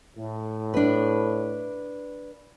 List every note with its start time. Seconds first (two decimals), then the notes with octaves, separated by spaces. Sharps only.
0.17 A2
0.74 D4 B4